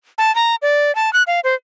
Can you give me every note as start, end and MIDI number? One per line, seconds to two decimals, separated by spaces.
0.18 0.34 81
0.35 0.55 82
0.62 0.94 74
0.95 1.13 81
1.13 1.23 90
1.27 1.40 77
1.44 1.55 72